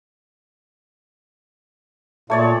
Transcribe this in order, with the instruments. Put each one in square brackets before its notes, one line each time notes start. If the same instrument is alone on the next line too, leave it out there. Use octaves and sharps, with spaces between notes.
[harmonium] A#2 [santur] A3 C#5 D5